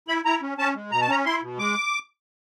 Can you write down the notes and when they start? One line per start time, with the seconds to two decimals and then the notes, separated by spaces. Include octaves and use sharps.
0.08 E4 B5
0.25 E4 A#5
0.41 C#4
0.58 C#4 A5
0.75 G#3
0.91 B2 A#5
1.01 A5
1.09 C#4 A#5
1.25 E4 C6
1.42 B2
1.59 G#3 D6